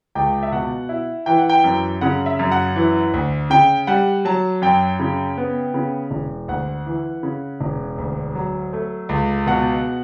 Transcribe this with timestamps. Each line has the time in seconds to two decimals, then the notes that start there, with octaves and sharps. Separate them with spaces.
0.15 C#2 G5
0.43 E5
0.52 B2 F#5
0.89 E4
1.26 E3 G5
1.38 F#5
1.49 G5
1.64 F#2
2.01 C#3 F#5
2.26 E5
2.39 F#2
2.52 F#5
2.76 E3
3.14 D2
3.50 C#3 G5
3.87 G3 F#5
4.25 F#3 A5
4.62 F#2 G5
4.99 C#3
5.37 B3
5.74 C#3
6.11 E1
6.48 D2 F#5
6.86 E3
7.23 C#3
7.61 E1
7.98 D2
8.35 F#3
8.73 A3
9.09 C#2
9.47 B2 F#5